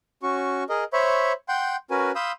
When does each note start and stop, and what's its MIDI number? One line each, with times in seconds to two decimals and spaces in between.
0.23 0.64 61
0.23 0.64 66
0.23 0.64 85
0.69 0.84 68
0.69 0.84 70
0.69 0.84 75
0.93 1.32 72
0.93 1.32 73
0.93 1.32 76
0.93 1.32 83
0.93 1.32 85
1.49 1.76 78
1.49 1.76 79
1.49 1.76 84
1.49 1.76 91
1.91 2.11 61
1.91 2.11 66
1.91 2.11 70
1.91 2.11 71
1.91 2.11 80
2.15 2.32 77
2.15 2.32 83
2.15 2.32 84
2.15 2.32 87
2.15 2.32 88
2.15 2.32 91